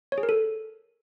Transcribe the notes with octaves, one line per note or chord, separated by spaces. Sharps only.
C#5
G#4
A#4
A4